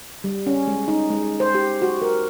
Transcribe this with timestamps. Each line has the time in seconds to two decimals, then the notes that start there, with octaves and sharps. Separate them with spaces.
0.24 G3
0.46 C#4
0.67 G#3
0.88 D#4
1.10 G#3
1.40 C5
1.55 G4
1.82 F#4
2.02 A#4